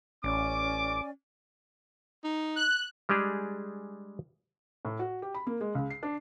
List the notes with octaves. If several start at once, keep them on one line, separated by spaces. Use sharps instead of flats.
A1 C#4 D5 G#5 D6
D#4
F#6
G3 G#3 D4 G4 G#4
A2
F#4
G4
B5
A#3
G#3
C#2
C7
D4